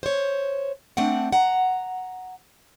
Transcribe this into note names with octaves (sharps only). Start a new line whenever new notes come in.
C5 C#5
A3 C4 D4 F#5
F#5 A#5